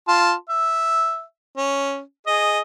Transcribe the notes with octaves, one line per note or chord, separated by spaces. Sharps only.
F4 A5 C6
E5
C#4
G#4 D#5